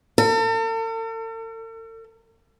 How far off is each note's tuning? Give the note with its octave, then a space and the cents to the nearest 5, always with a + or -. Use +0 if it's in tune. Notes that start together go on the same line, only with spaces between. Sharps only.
A4 +45